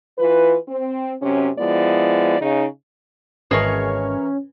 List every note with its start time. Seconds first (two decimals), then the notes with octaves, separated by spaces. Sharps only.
0.18 E3 F4 B4
0.68 C4
1.22 F#2 C3 C#4
1.58 F3 G#3 B3 E4 D5
2.40 C#3 D#4
3.51 G#1 E3 C#4 G#4 A#4 C#5 D#5 A5